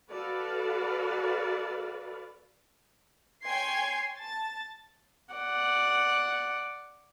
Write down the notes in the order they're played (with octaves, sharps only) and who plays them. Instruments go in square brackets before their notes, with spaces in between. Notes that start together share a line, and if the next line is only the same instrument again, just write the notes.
[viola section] F#4 A4 B4 D5 F5
[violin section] C#5 G5 G#5 C6 G#6 C7
A5 A6
[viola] D5 F#5